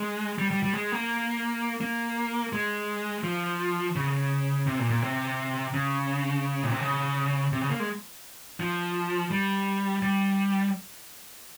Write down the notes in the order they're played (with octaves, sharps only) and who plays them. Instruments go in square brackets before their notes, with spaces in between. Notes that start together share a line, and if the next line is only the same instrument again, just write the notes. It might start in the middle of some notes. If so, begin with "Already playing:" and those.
Already playing: [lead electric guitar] G#3
G3
G3
G3
G#3
A#3
A#3
G#3
F3
C#3
C3
A#2
A#2
C3
C#3
A#2
C3
C#3
C3
C#3
A#3
G#3
F3
G3
G3